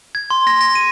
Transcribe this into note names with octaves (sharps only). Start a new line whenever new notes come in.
G#6
C6
A#6
A#6
D#7